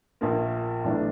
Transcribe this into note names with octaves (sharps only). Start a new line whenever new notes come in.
A#1 A#2 F3 A#3
B1 A2 E3 A3 D4